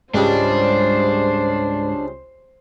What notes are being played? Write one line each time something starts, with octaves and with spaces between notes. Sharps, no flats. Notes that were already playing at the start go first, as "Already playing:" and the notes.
C#2 G#2 C#3 G3 G#3 D4 C5